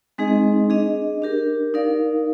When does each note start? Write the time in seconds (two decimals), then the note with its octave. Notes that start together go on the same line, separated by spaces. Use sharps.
0.18 G#3 C4 D#4 G#4 D#5
0.70 D4 G#4 D#5
1.22 D4 G4 A#4
1.74 D#4 A#4 D5 F5